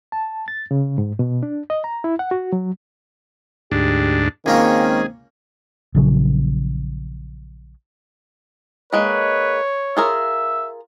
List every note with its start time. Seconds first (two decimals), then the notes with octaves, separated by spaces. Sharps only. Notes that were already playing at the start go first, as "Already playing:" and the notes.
0.12 A5
0.48 A6
0.71 C#3
0.98 G#2
1.19 B2
1.43 D4
1.70 D#5
1.84 A#5
2.04 E4
2.19 F#5
2.31 F#4
2.53 F#3
3.72 D2 G#2 D4 G4
4.46 C#2 D#3 A#3 C4 C#4 G#4
5.95 A#1 C#3 F#3
8.93 D#3 G#3 A#3 B4 C#5
9.97 F4 G#4 A#4 E5